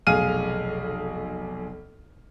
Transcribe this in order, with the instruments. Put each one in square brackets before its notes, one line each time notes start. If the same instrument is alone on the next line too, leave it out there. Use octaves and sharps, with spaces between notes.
[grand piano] F1 B1 G#4 F5 F6 D#7